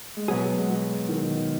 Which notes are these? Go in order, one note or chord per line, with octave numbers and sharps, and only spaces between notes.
G#3
B2 F#3 B3 G#4
G#3
F#3
D#3